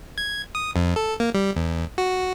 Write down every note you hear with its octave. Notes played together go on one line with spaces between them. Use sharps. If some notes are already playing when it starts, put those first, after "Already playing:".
G#6
D#6
F2
A4
A#3
G3
E2
F#4